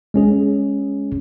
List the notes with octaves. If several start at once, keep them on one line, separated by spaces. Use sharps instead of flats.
G#3 C#4 G#4